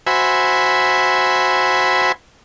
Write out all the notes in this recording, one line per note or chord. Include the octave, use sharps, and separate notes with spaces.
F#4 C5 E5 G#5 B5